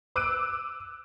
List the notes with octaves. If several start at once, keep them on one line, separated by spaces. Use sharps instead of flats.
D6 E6 F#6 D7 D#7